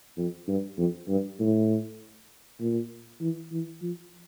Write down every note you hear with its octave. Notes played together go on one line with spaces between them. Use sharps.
F2
G2
F2
G2
A2
A#2
E3
E3
F3